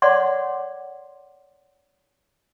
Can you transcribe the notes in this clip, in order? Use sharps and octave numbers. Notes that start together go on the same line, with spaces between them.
C#5 D5 F#5 C6 D6